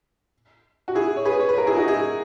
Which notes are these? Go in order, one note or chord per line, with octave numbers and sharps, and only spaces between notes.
F#4
E4 G#4
C#5
G#4 B4
C#5
B4
A#4
E4 G#4
D#4 F#4
E4 G#4